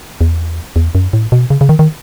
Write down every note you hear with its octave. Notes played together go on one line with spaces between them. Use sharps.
E2
E2
F#2
A2
B2
C#3
C#3
D#3
D#3